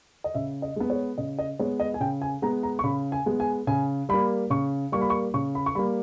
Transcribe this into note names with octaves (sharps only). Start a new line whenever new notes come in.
D#5
C#3 E5
D#5
G#3 B3
C#5
C#3 D#5
D#5
G#3 B3 C#5
D#5
G#5
C#3 G5
G#5
G#3 B3 A#5
A#5
C#6
C#3 B5
G#5
G#3 B3
G#5
C#3 G#5
G3 A#3 B5
C#3 C#6
G3 A#3 C#6
B5
C#6
C#3 C#6
B5
C#6
G3 A#3 B5